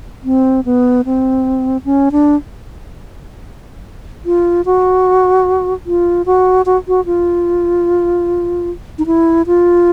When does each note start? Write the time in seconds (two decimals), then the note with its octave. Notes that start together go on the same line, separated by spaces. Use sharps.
0.24 C4
0.65 B3
1.05 C4
1.85 C#4
2.12 D4
4.26 F4
4.66 F#4
5.86 F4
6.26 F#4
6.66 F#4
6.88 F#4
7.06 F4
8.99 D#4
9.06 E4
9.47 F4